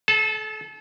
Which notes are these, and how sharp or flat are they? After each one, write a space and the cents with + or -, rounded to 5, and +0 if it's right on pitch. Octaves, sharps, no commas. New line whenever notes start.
A4 -35 A5 +0